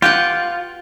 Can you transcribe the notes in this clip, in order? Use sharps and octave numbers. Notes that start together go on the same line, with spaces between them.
F4 G4 B4 F#5